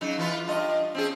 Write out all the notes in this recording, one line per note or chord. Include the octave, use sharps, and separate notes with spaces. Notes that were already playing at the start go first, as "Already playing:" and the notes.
C#3 F#3 D#4
E3 F4 B4
G2 F4 D#5
C4 C#4 G#4